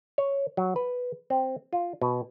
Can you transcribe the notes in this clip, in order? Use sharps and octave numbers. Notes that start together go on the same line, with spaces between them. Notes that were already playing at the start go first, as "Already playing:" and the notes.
C#5
F#3
B4
C4
F4
B2